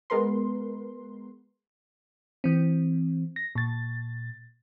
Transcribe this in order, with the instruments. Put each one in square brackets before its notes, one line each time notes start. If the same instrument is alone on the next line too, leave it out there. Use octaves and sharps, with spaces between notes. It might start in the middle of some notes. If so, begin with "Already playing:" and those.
[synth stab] G#3 B3 A#4 B4 C6
[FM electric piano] E3 C4
A#6
A#2 A6